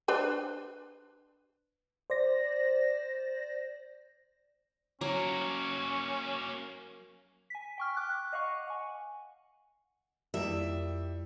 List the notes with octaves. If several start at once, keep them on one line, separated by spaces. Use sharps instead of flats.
D4 B4 C5
C5 D5 A#6
F#3 A#3 C#4 F#4
G#5 B6
G5 C#6 F6
G5 D6 F#6
D#5 F5 F#5 C#6
F#5 G#5
F2 D#3 G3 A#3 E4 E5